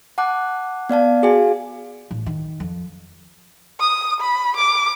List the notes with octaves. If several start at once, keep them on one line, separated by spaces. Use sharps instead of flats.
F#5 A5 D6 F#6
B3 D5 F5 A5
F#4 G#4 F5 G#5
A1
D#3
F2
D#6
B5
D6